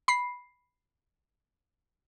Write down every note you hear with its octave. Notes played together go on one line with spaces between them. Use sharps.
B5 C7